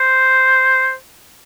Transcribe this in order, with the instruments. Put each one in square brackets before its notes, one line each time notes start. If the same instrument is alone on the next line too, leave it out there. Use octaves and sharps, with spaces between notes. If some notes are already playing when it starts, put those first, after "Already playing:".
Already playing: [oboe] C5